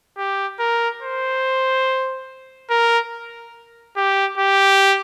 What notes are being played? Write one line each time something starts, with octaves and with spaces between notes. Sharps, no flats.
G4
A#4
C5
A#4
G4
G4